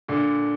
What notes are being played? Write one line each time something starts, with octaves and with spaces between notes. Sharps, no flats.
A#2 D3